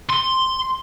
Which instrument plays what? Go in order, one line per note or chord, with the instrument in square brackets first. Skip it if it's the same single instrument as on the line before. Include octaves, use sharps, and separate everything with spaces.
[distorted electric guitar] C6